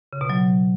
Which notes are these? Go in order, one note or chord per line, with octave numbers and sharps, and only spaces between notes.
C#3
B2
F#3